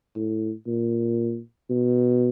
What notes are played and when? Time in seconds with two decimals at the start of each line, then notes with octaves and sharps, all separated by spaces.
0.16 A2
0.67 A#2
1.70 B2